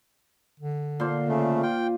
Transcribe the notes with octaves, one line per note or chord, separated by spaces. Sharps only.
D3
A#2 C5 C6
C#3 A3
F4 G5